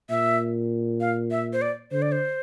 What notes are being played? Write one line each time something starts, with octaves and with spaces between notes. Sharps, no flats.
A#2 E5
F5
E5
C5
D5
D3 C5
D5
C5